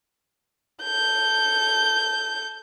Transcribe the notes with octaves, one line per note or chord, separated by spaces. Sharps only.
A4 G6